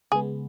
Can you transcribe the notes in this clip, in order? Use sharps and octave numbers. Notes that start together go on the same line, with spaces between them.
C#3 G#3 B3 G#4